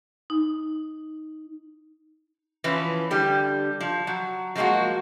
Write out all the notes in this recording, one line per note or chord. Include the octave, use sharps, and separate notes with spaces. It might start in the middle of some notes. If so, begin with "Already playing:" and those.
D#4
E3 F3 C#4 B4
D3 G3 G4
F3
F#3
F3 F#3 G#3 A#3 F#4